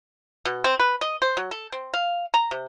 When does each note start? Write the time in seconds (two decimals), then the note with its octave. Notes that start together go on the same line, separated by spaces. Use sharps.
0.45 B2
0.64 C4
0.79 B4
1.01 D#5
1.22 C5
1.37 F#3
1.51 A4
1.72 C4
1.93 F5
2.34 A#5
2.51 C3